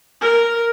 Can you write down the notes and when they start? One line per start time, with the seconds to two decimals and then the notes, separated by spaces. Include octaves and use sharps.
0.21 A#4